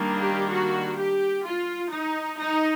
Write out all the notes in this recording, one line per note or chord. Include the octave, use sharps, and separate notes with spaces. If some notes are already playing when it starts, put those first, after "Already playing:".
Already playing: D#3 G3 A#3 D4
G4
F#4
G4
F4
D#4
D#4